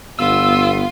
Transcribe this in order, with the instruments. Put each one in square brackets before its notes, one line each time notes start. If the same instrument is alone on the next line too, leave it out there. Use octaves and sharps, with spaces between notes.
[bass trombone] G1 [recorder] B3 [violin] F4 [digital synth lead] E6